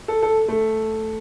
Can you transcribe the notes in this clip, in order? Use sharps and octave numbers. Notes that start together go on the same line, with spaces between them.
A4
A4
A3